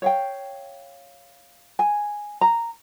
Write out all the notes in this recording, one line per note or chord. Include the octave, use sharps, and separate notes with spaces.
C#5 F5 G5
G#5
A#5